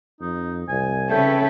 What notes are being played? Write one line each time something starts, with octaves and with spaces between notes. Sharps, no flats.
F2 D#4
C2 G#5
C#3 A4 B4 C#5 E5 G5